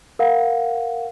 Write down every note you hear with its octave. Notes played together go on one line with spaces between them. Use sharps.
A#4 F5 F#5